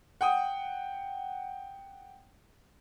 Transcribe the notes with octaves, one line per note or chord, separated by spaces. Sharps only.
F#5 G5 D#6